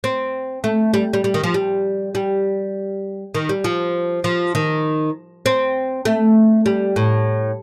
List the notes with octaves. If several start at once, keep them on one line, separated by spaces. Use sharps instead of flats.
C4
A3
G3
G3
G3
D#3
F3
G3
G3
D#3
G3
F3
F3
D#3
C4
A3
G3
A2